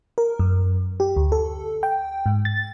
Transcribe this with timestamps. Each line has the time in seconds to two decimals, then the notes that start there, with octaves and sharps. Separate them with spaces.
0.18 A#4
0.39 F#2
1.00 G4
1.16 D2
1.32 A4
1.83 G5
2.26 G#2
2.45 A6